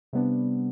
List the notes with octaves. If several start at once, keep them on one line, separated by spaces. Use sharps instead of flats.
C3 G3 B3 D4